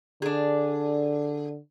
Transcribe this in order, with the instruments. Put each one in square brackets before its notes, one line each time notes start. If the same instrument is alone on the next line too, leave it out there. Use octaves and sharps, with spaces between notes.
[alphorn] D3 [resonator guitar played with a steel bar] D4 G#4